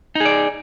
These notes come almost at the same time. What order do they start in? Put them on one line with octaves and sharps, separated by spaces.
D#4 G#4 D5